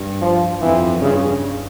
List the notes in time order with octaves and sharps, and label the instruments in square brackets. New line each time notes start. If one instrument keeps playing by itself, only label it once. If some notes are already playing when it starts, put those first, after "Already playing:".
Already playing: [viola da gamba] G2
[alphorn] F3
[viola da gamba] F2 [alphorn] E3
[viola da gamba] G2 [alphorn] C#3